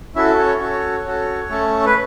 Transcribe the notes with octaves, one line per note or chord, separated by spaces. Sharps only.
C#4 E4 F#4 A4 E5
C#4 C#5
C#4 F#4 A4 C#5
C#4 F#4 A4
A3 C#4 A4
B4